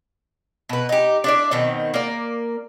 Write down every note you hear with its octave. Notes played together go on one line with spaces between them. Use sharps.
B2 B4
D#4 G4
D4 E4 D5
B2 D#3 C4
A#3 D5